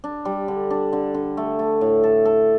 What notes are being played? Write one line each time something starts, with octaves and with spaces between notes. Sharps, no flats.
D4
G3
D3
D4
D3
D3
A3
A3
A2
A4
A4